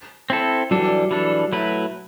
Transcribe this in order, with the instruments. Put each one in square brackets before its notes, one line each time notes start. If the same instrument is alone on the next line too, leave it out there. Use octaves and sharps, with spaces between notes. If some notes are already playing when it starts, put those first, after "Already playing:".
[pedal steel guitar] C4 E4 A4
[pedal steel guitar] E3 G3 D4 A4 [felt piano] F#3
[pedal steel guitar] E3 G3 D4 A4
F#3 A3 E4 B4